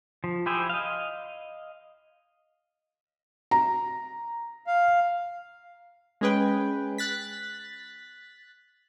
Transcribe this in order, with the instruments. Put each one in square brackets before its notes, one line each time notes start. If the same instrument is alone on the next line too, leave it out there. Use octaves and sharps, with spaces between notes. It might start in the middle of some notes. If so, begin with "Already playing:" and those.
[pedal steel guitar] F3
E4 G4 G#4 C5 E5
D#5 F5
[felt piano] A#5
[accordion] F5
[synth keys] G#3 C#4 G#4 B4 G5
F#6 A6 B6